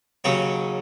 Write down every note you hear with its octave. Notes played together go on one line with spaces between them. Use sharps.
D#2 C#3 F#3 C#5